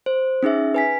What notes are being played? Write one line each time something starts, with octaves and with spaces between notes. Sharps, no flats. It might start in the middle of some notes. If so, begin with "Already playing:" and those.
C5
C#4 D#4 G#4 E5
B4 G#5 B6